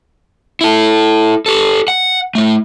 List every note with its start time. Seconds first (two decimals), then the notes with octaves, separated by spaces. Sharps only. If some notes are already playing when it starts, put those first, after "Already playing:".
0.61 E4 A4
1.46 G4 A4
1.88 F#5
2.35 A3 E4